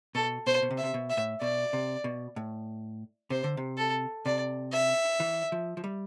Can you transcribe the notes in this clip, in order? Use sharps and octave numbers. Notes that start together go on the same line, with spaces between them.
B2 A4
B2 C5
B2
C3
E5
C3
B2
E5
A2
B2 D5
C3
B2
A2
C3 C5
D3
C3
A4
C3 D5
E5
E3
F3
F3
G3